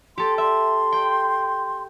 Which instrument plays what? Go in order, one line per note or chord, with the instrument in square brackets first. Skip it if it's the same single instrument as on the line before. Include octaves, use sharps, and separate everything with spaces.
[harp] G4 A4 [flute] C6
[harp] E5 [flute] C6
[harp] G5